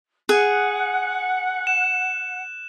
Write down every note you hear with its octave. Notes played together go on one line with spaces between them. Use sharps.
G#4 F#5 F#6
E7